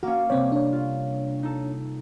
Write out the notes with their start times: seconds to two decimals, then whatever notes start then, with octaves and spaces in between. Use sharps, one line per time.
0.03 A#3 C#4 F#4
0.30 C3 G3 C4 C#5
0.52 D4 C#5
0.73 F4
1.43 D#4 A4